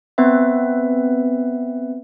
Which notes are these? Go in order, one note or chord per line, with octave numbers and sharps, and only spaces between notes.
B3 C4 B4 E5